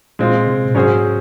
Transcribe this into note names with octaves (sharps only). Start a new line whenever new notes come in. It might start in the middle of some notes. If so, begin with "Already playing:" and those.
A#2 G#3 C4 F4
C3
A#2
G#2 F#3 C#4 G#4 C5